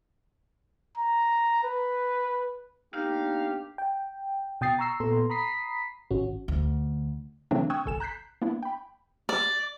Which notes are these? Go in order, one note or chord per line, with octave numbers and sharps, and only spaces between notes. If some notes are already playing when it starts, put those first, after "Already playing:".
A#5
B4
A#3 B3 D4 D#4 G4 F5
G5
B2 G5 D#6 A6 C7
A#5 C#6 E6 C7
A#2 B3 A4 A#5 C6
A#5 B5 D#6 B6 C7
G#1 C#4 F#4
D2
C#3 E3 F#3 A3 C4 D4
G5 C#6 D#6 E6 F#6 G#6
G1 C2 A4 G#5 E7
A#5 F#6 G6 B6 C7
A#3 B3 D4 E4
G5 B5
D5